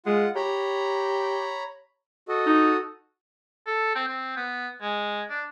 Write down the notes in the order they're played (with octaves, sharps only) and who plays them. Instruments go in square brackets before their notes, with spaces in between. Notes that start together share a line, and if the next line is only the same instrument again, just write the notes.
[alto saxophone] G#3 [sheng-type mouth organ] F4 F#5
[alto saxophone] G4 [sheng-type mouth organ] C#5 A#5 B5
[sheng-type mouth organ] F#4 A4 D#5
[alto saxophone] D#4
[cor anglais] A4
C4
C4
B3
G#3
D4